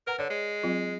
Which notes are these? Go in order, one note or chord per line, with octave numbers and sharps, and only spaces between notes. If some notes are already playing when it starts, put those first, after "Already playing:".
A#4 B4 F#5 A#5
D3 C#5 D5
G#3
F#3 C4 F4